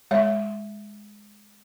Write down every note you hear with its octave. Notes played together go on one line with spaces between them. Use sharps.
G#3 C#5 E5